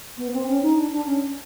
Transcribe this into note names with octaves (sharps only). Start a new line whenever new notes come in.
B3
C4
C#4
D#4
D4
D4
C#4